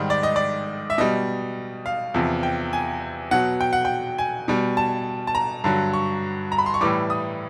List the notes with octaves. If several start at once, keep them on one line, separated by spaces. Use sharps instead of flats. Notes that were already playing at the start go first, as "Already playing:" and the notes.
Already playing: G#2 D#3 G3
D5
D#5
D5
E5
B2 G3 D#5
F5
E2 C3 F3
G5
G#5
B2 F#3 F#5
G5
F#5
G5
G#5
B2 G3
A5
A5
A#5
G2 D3 F#3
C#6
A#5
B5
C6
C#6
A2 E3 G3 D6
D#6